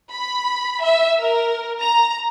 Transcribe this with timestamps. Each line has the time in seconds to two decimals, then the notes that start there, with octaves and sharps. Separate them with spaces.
0.11 B5
0.83 E5
1.20 A#4
1.80 A#5